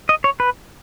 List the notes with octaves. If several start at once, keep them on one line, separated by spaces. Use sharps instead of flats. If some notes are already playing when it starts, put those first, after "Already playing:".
D#5
C#5
B4